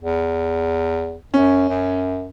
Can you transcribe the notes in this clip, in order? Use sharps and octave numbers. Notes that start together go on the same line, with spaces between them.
E2
F#2 C#4
F#2